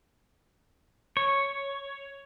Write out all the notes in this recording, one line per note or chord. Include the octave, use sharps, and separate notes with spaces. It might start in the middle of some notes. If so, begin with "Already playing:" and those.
C#5